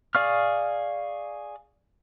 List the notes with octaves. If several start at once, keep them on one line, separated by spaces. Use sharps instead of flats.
G#4 D5 F5 C#6 F6